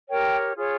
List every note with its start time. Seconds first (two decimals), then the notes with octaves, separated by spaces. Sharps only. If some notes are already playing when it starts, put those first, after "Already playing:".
0.08 G4 A#4 C#5 G5
0.54 F4 G#4 C#5